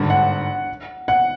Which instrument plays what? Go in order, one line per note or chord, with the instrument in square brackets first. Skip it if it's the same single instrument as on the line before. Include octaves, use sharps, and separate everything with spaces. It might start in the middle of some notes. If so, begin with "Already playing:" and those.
Already playing: [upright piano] G#1 G2 D3
[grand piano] F#5
F#5